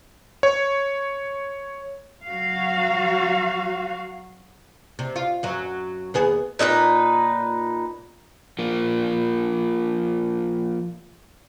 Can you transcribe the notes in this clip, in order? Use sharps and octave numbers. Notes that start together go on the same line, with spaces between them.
C#5
F#3 F#4 F5
C3
F4
F#2 F#3
D#2 B3 G#4
A#2 D#4 G#4 B4
F3 A#3